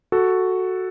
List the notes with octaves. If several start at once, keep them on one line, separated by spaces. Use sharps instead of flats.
F#4 A4